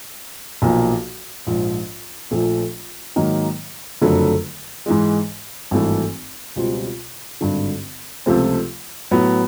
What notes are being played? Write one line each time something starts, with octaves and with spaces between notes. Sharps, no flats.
B1 A#2 F3 A#3
A#1 G#2 F3
A#1 A#2 F3 A3
G#2 D#3 F#3 A#3 D#4
F#1 F2 D3 F#3 A3
G#2 E3 G#3
G#1 G2 E3 A3
C#2 B2 G3 C4 F4
G#1 G2 D3
C#2 C3 F3 A3 C4
A2 F#3 B3